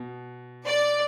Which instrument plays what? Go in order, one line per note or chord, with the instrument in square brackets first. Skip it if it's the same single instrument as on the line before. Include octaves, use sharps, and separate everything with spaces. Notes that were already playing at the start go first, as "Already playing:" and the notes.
Already playing: [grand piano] B2
[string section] D5